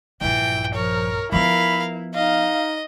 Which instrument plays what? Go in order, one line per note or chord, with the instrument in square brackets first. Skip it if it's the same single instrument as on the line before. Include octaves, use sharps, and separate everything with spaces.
[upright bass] A#1 G2 [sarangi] E3 [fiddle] G5
[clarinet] F3 [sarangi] A#4 [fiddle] C#5
[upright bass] F3 B3 [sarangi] E4 [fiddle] A#4 F5 [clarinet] B5
[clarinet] D#4 [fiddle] D#5 [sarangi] F5